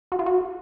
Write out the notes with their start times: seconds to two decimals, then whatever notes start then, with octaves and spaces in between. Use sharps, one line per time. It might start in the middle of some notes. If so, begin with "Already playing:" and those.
0.12 F#4
0.19 F4
0.26 F#4